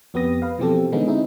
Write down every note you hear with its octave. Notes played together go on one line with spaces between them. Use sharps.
F2 B3 G4 B4 D#6 A#6
B4 F5
B2 E3 F3 C4 G4 A4
D3 E3 G#3 B3 C#4 D#4
C4 D#4 E4 G#4